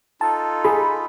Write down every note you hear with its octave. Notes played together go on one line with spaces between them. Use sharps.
D#4 F4 A4 A5
G#4 B5